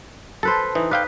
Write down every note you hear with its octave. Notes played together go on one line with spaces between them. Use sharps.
A4 B4 C5 A5
E3 D#4
B4 D5 F5 G5